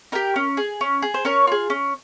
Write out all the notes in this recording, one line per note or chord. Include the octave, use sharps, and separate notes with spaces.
D#4 G4 A#4
C#4
G#4
C#4
G#4
C5
C#4 A#4 C#5
F4 G#4
C#4